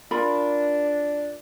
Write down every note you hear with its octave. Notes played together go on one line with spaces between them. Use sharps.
D4 F4 A#4 B5